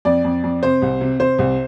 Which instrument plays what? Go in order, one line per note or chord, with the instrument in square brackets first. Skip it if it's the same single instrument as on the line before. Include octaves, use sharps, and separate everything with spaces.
[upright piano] F2 D5
F2
F2
C3 C5
C2
C3
C3 C5
C2